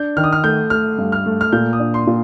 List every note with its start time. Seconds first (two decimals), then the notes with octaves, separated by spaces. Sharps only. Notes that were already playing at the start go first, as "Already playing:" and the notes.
Already playing: D4 G6
0.17 D#3 F6
0.24 D#6
0.32 F6
0.44 A3 G6
0.70 A3 F6
0.99 G2
1.12 F6
1.26 A3
1.41 F6
1.52 A#2 G6
1.73 D#6
1.79 D4
1.94 C6
2.07 A#2